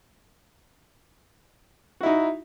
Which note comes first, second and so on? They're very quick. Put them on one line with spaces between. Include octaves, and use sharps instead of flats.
F#4 E4 D#4